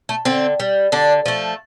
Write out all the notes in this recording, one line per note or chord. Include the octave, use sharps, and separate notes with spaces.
A3
D3 C4
G3
D3 D4
F3 A3